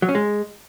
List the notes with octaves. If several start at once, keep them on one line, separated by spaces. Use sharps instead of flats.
F#3
C#4
G#3